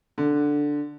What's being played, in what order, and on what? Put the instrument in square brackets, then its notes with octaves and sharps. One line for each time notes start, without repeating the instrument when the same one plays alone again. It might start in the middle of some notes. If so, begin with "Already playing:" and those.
[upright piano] D3